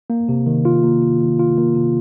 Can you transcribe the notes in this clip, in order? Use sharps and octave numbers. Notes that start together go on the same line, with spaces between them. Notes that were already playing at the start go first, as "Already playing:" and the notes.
A#3
C3
D#3
F4
A#3
C3
D#3
F4
A#3
C3